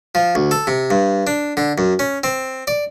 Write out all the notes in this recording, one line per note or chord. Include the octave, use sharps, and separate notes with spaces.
F3
D2
A4
C3
G2
D4
D3
F#2
C#4
C4
D5